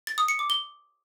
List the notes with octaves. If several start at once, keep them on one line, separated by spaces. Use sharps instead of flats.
A6
D#6
C#7
D6
G7